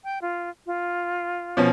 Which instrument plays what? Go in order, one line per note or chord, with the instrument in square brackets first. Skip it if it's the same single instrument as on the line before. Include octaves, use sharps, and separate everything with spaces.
[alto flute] G5
F4
F4
[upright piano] B2 F3 C#4